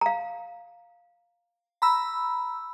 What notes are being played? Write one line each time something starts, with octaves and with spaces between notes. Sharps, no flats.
F5 A#5
A#5 B5 E6